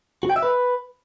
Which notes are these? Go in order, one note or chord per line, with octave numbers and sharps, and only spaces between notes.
F#4
G5
E5
B4